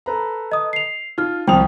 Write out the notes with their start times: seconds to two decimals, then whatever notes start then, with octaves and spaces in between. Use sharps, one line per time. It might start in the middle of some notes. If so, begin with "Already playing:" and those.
0.06 A4 B4 A#5
0.52 D#5 D#6
0.73 C7 F7
1.18 D#4 F4 F6
1.48 C2 F3 G5 D#6 F7